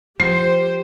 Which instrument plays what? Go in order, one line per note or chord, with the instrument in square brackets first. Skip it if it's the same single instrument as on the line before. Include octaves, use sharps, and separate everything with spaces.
[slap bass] F3 [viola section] G4 C5 [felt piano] C7